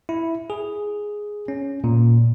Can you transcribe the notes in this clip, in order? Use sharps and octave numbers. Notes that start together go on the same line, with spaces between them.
E4
G#4
C#4
A#2